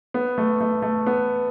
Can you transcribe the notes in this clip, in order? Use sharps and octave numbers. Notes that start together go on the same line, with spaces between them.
B3
A3
A3
A3
B3